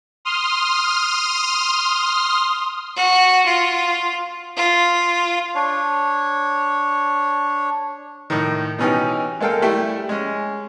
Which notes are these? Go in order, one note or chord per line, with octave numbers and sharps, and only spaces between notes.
C6 D#6 F6
F#4
F4
F4
D4 C#5
A2 D#3
B2 E3 C#4 D#4 G4
G#3 A#3 A4 F5 G5
G3 A3 E4 G4
G#3 C#4